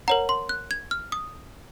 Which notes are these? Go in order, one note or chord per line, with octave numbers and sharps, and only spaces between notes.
A#4 C#5 F#5 A#5
C6
F#6
G#6
F6
D#6